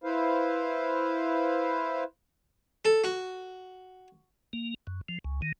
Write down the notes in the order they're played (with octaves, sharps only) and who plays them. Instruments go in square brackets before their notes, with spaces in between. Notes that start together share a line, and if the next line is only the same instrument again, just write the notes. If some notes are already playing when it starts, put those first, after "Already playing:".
[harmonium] E4 B4 C5 F5
[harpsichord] A4
F#4
[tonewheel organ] A#3
F#2
F3
C#2
D#3